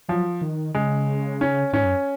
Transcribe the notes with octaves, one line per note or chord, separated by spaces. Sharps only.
F3 F#3
D#3
C#3 G#3
C#4
G#2 C#4
F#2